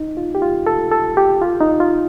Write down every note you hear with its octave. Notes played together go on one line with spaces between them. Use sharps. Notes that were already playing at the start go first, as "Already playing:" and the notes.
Already playing: D#4
F4
G4
F4
A4
A4
G4
F4
D#4
F4